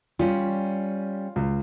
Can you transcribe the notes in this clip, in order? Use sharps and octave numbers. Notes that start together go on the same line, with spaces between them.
G3 C#4 F4
C#2